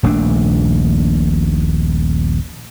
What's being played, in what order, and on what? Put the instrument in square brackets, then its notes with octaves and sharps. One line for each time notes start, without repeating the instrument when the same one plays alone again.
[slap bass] D#1 A#1 A3 D4